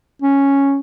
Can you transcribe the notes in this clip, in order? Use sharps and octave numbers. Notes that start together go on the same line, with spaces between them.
C#4